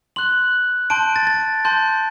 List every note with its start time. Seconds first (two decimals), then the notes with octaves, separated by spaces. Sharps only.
0.16 C6 F#6 F#7
0.90 A5 C6 G6 D7
1.16 A6
1.27 A6
1.65 A5 C6 G6